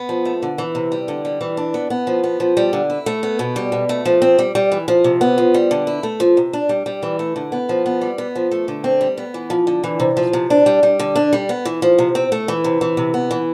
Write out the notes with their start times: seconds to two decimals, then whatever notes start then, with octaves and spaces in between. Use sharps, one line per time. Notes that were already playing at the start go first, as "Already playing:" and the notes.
Already playing: B3
0.09 F3
0.25 A3
0.42 D3
0.58 E3
0.75 C3
0.92 G3
1.08 D3
1.25 G3
1.41 E3
1.57 D4
1.74 B3
1.90 B3
2.07 F3
2.24 B3
2.40 F3
2.57 G3
2.73 D3
2.90 E4
3.06 A3
3.23 B3
3.39 B2
3.56 G3
3.72 B2
3.89 A3
4.05 F3
4.22 C4
4.39 G3
4.55 G3
4.72 E3
4.88 F3
5.04 C3
5.21 B3
5.38 F3
5.54 G3
5.71 D3
5.87 E4
6.03 A3
6.20 F3
6.37 C3
6.53 D4
6.69 G3
6.86 G3
7.03 E3
7.19 A3
7.36 D3
7.52 B3
7.69 F3
7.86 B3
8.01 G3
8.18 B3
8.36 F3
8.51 A3
8.68 D3
8.84 C4
9.01 G3
9.17 B3
9.34 E3
9.50 F3
9.67 D3
9.84 E3
10.00 C3
10.17 F3
10.33 C3
10.50 D4
10.66 G3
10.83 G3
10.99 D3
11.16 D4
11.33 G3
11.49 B3
11.65 E3
11.82 F3
11.99 C3
12.15 C4
12.32 A3
12.48 E3
12.64 C3
12.81 E3
12.97 C3
13.14 B3
13.31 E3